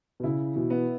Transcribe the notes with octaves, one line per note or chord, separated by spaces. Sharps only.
B2
C#3 E4
B2 E3
B3